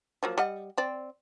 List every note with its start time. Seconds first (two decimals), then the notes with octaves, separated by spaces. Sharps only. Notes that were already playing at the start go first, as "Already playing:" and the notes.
0.23 F3 F#3 A#3
0.38 G3 D#5 F#5
0.78 C4 D5